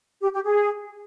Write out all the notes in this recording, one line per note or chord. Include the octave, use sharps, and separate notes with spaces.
G4
G4
G#4